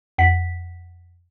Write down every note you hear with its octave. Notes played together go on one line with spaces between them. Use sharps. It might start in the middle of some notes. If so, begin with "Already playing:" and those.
F2 F#5 B6